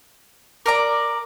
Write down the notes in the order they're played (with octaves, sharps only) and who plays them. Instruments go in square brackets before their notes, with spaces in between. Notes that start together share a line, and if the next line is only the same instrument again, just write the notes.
[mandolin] A#4 D5 A#5 [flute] D6